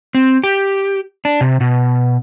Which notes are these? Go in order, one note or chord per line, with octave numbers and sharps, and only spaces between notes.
C4
G4
D4
C3
B2